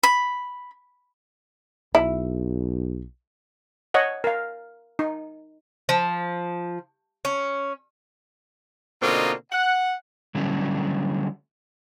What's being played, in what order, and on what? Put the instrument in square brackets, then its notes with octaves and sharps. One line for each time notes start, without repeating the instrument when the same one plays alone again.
[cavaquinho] B5
[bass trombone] B1 [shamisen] E4
[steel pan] C#5 D#5 F#5
A#4 F5
D#4
[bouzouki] F3
C#4
[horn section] B2 D3 A#3 C4 D#4 F4
F#5
[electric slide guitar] D3 F#3 G3 A3 C#4 D4